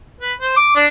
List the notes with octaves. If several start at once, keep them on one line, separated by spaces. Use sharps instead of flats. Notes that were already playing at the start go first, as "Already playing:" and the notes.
B4
C5
D6
D4